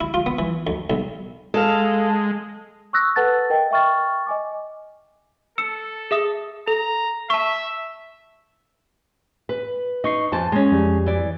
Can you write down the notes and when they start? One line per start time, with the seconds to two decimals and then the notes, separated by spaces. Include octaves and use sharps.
0.01 E4
0.14 F4
0.26 B3
0.39 E3
0.67 D2
0.90 B1
1.54 G#3 A4 F5
2.93 C#6 D#6 E6 F#6 A#6
3.16 A4 B4 F#5 A5 A6
3.50 A#4 D#5 G5
3.71 E5 G5 C#6 F6 A6
4.26 D#5 G#5 D6
5.58 A4 E6 C#7 E7
6.11 G#4 E5 D#6
6.68 A4 A#5
7.30 E5 A5 C#6
9.49 B4
10.04 D#4 D#5 C#6 C7
10.32 F2 C5 G#5 A5
10.52 G#3 C#4
10.72 F2 G3
11.06 E3 D5